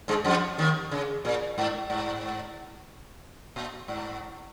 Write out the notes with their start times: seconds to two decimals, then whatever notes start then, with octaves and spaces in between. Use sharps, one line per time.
0.08 G#2 G#3
0.25 F2 F3
0.58 D#2 D#3
0.91 C#3
1.25 A#2
1.58 G#2
1.90 G#2
3.56 A#2
3.88 G#2